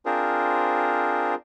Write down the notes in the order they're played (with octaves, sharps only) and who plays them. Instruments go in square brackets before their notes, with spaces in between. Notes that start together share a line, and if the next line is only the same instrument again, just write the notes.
[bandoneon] C4 D4 F4 G#4 A#4 C5